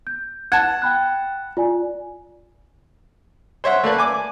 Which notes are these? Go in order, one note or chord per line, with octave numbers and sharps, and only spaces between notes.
G6
F#5 A5 G#6
G5 B5 F#6
F4 D5 G#5
C5 C#5 E5 F#5
A3 A#3 B4 D5
G#5 D6